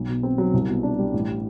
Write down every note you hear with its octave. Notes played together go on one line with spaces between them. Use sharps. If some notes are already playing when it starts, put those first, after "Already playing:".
Already playing: B1
B2
C4
F#3
C2
B2
D4
G3
A1